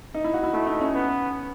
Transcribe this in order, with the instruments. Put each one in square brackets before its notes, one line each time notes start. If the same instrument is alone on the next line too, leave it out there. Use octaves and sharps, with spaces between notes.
[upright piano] D#4
E4
F#4
E4
[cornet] A3 [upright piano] E4
[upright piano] D#4
C#4
[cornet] B3